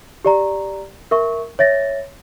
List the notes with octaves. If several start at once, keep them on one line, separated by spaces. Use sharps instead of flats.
G4 D5 A#5
A#4 E5 C#6
C#5 E5 A6 A#6